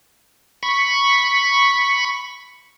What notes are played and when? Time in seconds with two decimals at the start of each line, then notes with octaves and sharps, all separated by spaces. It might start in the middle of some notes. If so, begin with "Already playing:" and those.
0.63 B5 C#6